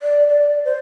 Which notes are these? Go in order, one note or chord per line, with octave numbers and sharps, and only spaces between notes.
D5
D5
C5